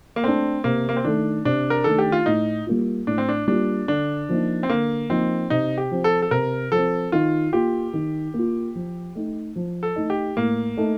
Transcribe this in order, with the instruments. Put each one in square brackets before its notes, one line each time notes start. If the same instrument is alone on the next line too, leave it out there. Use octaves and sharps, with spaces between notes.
[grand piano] A#3
[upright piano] A3 D4 [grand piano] C4
[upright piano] C3 [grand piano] A#3
[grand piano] A#3
C4
[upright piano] D#3 A3 [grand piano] D4
[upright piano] C3 [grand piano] D4
[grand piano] A#4
[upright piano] D#3 A3 [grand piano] A4
[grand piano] G4
F4
[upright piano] A2 [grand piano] D#4
[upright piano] G3 A#3 F4
[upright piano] A2 [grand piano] D4
[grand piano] C4
D4
[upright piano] G3 A#3 F4 [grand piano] D4
[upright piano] D3 [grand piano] D4
[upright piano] F3 A#3 D#4
[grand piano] C4
[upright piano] D3 [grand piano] A#3
[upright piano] F3 A#3 D#4 [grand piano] C4
[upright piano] C3 [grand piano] D#4
[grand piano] G4
[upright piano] F3 C4
[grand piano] A4
A4
[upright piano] C3 [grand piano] A#4
[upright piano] F3 [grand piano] A4
[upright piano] C4
[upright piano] D#3 [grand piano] F4
[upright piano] A#3 F4 [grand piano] G4
[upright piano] D#3
A#3 F4
F3
A3 D#4
F3
[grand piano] A4
[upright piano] A3 D#4
[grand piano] G4
[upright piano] A2 [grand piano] A#3
[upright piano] A3 D#4